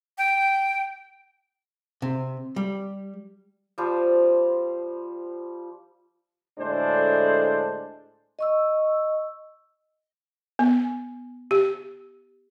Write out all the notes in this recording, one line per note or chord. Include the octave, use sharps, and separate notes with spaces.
G5
C3
G3
F3 G3 C5
D2 A2 G#3 D4 A4 C5
D#5 C#6 E6
B3
G4